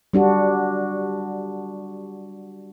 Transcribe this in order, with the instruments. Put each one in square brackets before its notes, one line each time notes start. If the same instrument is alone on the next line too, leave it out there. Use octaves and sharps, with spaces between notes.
[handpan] G3 D4 F#4